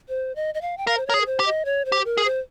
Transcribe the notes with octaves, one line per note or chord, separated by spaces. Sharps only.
C5
D#5
D#5
F5
G5
A#4 F5
C5
A#4 C#5
G#4
A#4
C5
G4
D#5
C#5
C5
G4
A#4
G#4
C5